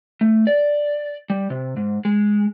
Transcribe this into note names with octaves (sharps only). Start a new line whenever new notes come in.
A3
D5
G3
C3
G#2
G#3